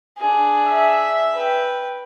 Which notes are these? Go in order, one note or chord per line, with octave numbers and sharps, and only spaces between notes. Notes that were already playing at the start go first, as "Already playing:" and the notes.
D4 G#4
E5
B4 G5